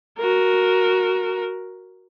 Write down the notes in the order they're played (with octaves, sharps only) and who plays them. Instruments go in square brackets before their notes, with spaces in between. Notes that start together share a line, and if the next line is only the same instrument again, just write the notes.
[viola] F#4 A#4